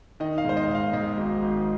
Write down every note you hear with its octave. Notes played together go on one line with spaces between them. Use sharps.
D#3 D#5
F5
G#2 C5
D#5
G#2
F5
G#2 D#5
G#1
G#1